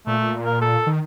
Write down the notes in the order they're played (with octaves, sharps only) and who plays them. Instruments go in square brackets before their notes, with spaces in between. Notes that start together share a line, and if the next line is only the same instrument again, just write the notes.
[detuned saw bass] A#2 [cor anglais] A3
[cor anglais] A#4
A4
[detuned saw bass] D#3